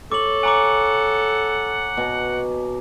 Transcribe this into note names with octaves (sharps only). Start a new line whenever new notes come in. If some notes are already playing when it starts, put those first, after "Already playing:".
A4 C#5 D6 F#7
F#5 G#5 A#5 D6
B2